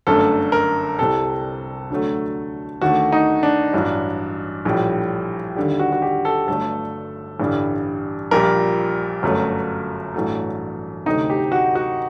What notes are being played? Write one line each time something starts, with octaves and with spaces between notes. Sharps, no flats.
G1 F#2 D3 A3 A4
A#4
C2 C3 G3 A4
D2 D3 F#3 A3
D#2 D3 A3 F#4
D#4
D4
A1 G2 F#3
A#1 A2 G3
D#2 D3 G3
F#4
F#4
G4
A4
G1 G2 F#3 A3 A4
A1 G2 D3 G3
A#1 A#2 G3 A#4
G1 F#2 F#3 A3
A1 G2 F#3 A3
D2 C3 F#3 A3 D#4
G4
F#4
F#4